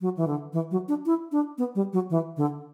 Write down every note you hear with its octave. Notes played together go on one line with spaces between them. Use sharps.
F#3
E3
D3
E3
F#3
D4
E4
D4
B3
G3
F#3
E3
D3